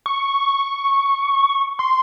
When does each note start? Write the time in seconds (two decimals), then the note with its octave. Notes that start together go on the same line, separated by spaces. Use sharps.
0.06 C#6
1.79 C6